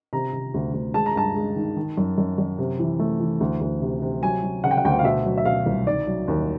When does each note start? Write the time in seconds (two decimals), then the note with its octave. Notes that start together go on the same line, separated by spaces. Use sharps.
0.13 C3 A#5
0.33 C3
0.54 D2
0.74 D2
0.94 G#3 A5
1.06 A#5
1.15 G2 A5
1.36 G#3
1.56 D#3
1.77 D#3
1.97 F#2
2.18 F#2
2.38 F#2
2.58 C3
2.79 E3
2.99 A3
3.20 E3
3.40 D2
3.61 D2
3.82 C3
4.02 C3
4.23 F#3 G#5
4.43 F#3
4.64 C#3 F#5
4.71 G5
4.78 F#5
4.85 D2 G5
4.92 F#5
4.99 F5
5.05 B2 E5
5.25 F#3
5.38 E5
5.45 B2 F5
5.66 C2
5.87 D#3 D5
6.07 F#3
6.28 D#2